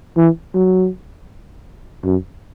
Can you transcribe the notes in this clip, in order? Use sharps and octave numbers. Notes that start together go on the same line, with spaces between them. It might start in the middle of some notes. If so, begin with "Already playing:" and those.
E3
F#3
F#2